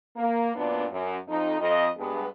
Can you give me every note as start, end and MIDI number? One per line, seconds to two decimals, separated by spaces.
0.17 0.50 58
0.55 0.85 42
0.55 0.85 46
0.55 0.85 59
0.55 0.85 62
0.91 1.15 42
1.27 1.58 41
1.27 1.58 63
1.59 1.87 41
1.59 1.87 75
1.97 2.24 43
1.97 2.24 56
1.97 2.24 59